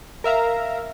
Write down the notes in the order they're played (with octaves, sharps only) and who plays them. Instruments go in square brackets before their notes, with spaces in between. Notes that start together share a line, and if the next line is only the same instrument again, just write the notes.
[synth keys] A#4 E5 F5 A#5